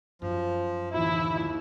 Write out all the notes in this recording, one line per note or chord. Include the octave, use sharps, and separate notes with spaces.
F#2 F3
D1 D#2 E3 E4